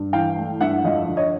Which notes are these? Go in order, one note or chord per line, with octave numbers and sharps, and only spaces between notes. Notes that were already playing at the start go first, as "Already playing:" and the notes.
Already playing: G2
E3 F5 G5
A3
G2 E5 F#5
F2 D#5 F5
D3
C#5 D#5